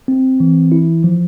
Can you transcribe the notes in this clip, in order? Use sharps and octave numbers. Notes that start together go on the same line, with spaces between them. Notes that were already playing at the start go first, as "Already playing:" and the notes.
C4
E3
E4
F3